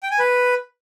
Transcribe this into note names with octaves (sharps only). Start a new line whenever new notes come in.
G5
G#5
B4